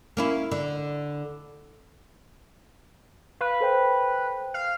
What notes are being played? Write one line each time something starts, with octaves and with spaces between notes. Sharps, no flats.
A#3 C#4 E4
D3
B4 F5
A4 C5 G5
F5